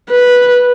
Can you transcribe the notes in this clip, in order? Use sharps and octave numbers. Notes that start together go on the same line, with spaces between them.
B4